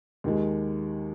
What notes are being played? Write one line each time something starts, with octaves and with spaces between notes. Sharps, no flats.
D#2 D#3 G#3